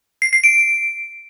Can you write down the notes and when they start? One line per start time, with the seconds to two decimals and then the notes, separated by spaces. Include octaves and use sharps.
0.22 C7
0.33 C7
0.44 D7